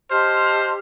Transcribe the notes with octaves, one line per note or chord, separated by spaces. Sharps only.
G4 C5 D#5 A5 C6 F6